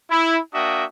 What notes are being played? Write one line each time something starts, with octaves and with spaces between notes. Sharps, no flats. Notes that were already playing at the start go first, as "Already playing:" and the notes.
E4
A#3 D4 F#4 E5 G5 D#6